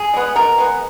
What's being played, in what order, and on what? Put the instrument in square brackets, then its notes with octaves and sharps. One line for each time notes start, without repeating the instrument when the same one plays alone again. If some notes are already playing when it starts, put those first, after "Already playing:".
Already playing: [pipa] G#4
G#3 B3
B2 A#4
G#3 B3